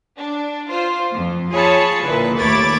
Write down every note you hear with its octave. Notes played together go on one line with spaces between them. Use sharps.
D4
F4 C5
F2
F4 G#4 C#5 A5 B5 C#7
A#1 A#2 D3 E4 B4
D#2 A3 C#5 B5 D6 A6